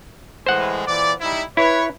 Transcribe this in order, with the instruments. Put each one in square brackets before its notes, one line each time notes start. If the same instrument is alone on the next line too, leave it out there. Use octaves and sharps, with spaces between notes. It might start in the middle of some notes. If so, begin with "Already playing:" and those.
[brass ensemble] A2 E3 G#3 [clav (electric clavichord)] C5 F#5
[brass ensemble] A#2 E3 D5
G3 D#4 E4
[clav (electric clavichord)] E4 [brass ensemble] B4 C#5